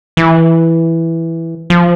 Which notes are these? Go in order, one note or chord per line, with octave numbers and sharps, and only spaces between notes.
E3
F3